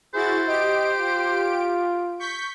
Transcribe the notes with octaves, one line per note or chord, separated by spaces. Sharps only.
E4 F#4 G#4 C5 A6
G4 D#5 D7
F4
C#6 G6 B6